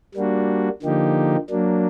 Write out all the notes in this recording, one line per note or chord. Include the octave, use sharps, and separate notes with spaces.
G3 A#3 D4 F#4
D3 F3 A#3 D#4 G4
F#3 A#3 D4